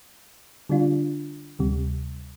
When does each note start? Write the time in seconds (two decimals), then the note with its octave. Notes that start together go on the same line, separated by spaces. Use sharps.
0.69 D3 G3 D4 F4
1.59 D2 C3 G3